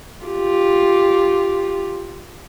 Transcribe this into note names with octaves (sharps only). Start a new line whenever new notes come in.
F4 G4